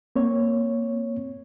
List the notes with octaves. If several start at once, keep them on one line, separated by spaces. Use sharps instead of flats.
A#3 C4 C#5